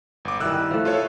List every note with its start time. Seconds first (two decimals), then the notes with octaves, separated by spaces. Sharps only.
0.25 G1 D6
0.40 D#3 E3 G3 E6 F#6
0.71 F3 A3
0.85 F4 A4 C#5